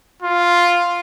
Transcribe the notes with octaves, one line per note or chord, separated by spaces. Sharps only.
F4